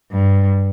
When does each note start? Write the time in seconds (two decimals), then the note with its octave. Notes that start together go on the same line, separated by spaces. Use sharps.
0.12 G2